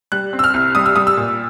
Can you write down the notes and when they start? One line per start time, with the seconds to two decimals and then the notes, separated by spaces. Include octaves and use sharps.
0.12 G3 F#6
0.33 C4
0.39 E6
0.44 F6
0.54 C2
0.75 G3 D#6
0.86 E6
0.96 G3 D#6
1.07 E6
1.17 A#2